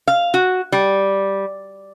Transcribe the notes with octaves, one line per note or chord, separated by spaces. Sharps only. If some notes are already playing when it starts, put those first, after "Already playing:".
F5
F#4
G3